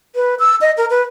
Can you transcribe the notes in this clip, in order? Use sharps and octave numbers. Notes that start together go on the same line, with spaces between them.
B4
E6
D#5
A#4
B4